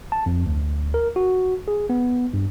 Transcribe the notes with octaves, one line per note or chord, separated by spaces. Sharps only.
A5
F2
D2
A#4
F#4
G#4
B3
G2